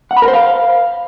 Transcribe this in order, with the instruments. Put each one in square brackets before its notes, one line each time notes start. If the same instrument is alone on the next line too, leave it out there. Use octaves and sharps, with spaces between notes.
[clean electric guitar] F#5
B5
A#4
C5
F5